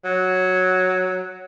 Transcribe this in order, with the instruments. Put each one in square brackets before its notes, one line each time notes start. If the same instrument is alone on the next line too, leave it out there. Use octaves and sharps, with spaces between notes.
[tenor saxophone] F#3